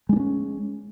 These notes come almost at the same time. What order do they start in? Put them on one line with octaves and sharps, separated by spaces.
G#3 D4 A#3 C#4